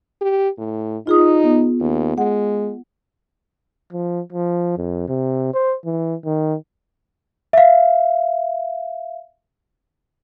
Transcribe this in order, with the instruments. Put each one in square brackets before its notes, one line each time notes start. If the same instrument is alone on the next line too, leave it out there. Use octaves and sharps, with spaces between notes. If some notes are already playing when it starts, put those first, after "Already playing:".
[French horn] G4
A2
[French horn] D#4 [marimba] F4 G#4 D#6
[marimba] B3
[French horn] D#2
[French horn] G#3 [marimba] F#5
[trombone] F3
F3
F2
C3
C5
E3
D#3
[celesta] E5 F5